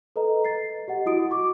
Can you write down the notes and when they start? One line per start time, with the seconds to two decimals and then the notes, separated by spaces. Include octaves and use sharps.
0.16 A4 B4 D#5 A#5
0.45 A6 C7
0.88 G4 D#5 F#5
1.06 E4 F#4 D#6 D7
1.30 F#4 C#6 D6